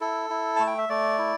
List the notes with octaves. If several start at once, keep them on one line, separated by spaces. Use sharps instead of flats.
E4 A4
E4
A3 A5
G5
E5
A3 D5
E4